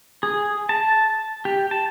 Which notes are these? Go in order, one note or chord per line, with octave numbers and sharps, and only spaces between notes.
G#4
A5
G4
A5